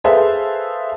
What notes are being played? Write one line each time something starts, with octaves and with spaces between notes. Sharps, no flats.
G#4 A4 B4 C5 E5 F5